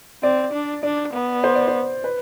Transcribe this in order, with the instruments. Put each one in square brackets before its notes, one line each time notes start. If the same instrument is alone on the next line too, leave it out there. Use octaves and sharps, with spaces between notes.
[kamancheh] C4 [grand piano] D5
[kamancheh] D4
[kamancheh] D4 [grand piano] D5
[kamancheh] B3
[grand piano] C5
D5
C5
B4